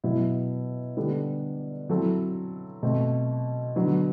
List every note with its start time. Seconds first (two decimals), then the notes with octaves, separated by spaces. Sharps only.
0.04 B2 F#3 B3 E4
0.97 D3 G3 B3 D4 A4
1.89 F#3 C4 E4 A4
2.83 B2 A3 C4
3.76 D3 F#3 B3